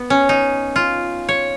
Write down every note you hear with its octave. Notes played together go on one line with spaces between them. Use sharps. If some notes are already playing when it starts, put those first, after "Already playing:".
Already playing: B3
C#4
D#4
F4
C#5